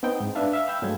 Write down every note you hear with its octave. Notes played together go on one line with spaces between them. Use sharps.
B3 C4 D#4 G5
G#2
D4 B4 E5 F5 A5
E5 F5
F5 G5 B5 E6 G6
G2 F#3 G#3 A3 G#4 G#6